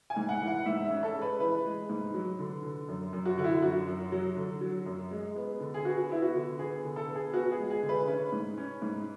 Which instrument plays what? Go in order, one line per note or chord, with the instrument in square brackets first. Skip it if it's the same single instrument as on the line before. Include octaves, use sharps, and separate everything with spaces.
[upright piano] G#5
G#2
F#5
E3
F#5
G#2 E5
E5
C#4
A4
G#3
B4
E3 B4
G#3
G#2
F#3
D3
D3
F#2
F#2
F#4
D3 F#4
E4
F#2 F#4
F#2
F#3
D3
F#3
F#2
G#3
B3
D3
G#4
B3 F#4
B3 E4
F#4
D3
B3 G#4
D3
A4
B3
G#4
B3 F#4
G#4
G#3
G#4
D3
B4
C#4 B4
G#2
C#4
G#2